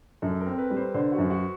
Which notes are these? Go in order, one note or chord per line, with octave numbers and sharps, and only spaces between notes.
F#2 A4
A#4
C4
B4
G3
C5
D3 C5
F#4
F#2
F#4